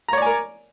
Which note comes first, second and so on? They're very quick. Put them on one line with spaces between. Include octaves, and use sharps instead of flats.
A#5 C#5 D5 G#5 A#4